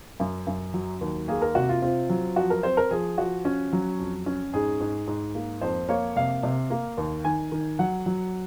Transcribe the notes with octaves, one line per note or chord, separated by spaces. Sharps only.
F#2
F#2
F#3
D#2
A#3 G#4
A#4
C3 F#4
F4
C4 F4
F#3
F3 F#4
A#4
C4 C5
A#4
F3 G#4
F3 F#4
C#4
F#3
F2
C#4
G#2 G#4
G#2
G#2
A#3
F2 C5
A#3 C#5
C3 F5
C3
A#3
D#2
D#3 G#5
D#3
F#3 F#5
F#3